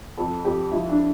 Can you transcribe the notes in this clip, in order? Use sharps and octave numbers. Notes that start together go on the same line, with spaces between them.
F2 A4
F2 G4
F3 E4
D4